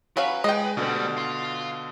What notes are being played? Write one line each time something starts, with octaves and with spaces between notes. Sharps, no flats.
F#3 C#4 B4 F5
G#3 D#5 G5
D2 B2 D3 G3
F5 C6